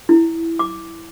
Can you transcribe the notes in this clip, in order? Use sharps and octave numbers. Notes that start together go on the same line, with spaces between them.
E4
D6